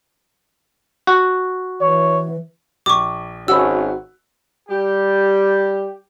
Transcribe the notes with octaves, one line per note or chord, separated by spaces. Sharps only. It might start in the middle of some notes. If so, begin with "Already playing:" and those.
F#4
E3 C#5
A#1 C#6 D6
G#1 C#4 F#4 B5 E6
G3 G4